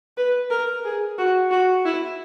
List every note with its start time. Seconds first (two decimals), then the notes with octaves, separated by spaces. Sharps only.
0.17 B4
0.50 A#4
0.84 G#4
1.18 F#4
1.51 F#4
1.85 E4